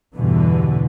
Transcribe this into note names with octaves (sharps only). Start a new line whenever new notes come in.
E2 G2 B2 D3 E3